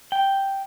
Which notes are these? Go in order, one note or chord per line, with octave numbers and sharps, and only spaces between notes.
G5